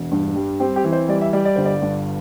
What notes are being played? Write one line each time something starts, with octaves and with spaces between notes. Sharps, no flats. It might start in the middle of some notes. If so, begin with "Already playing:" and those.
Already playing: E1
G2
G3
C4 G4
G4
E3
C5
G3 D5
E5
G3 D5
D5
G1 C5
D5
G2